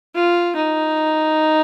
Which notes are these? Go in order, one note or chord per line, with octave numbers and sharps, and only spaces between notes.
F4
D#4